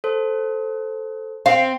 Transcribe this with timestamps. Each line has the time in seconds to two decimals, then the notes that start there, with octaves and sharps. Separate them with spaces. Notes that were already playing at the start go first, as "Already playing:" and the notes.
0.04 A4 C5
1.46 C4 F5